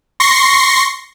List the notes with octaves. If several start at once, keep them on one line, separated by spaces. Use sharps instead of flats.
C6 C#6 A#6 C7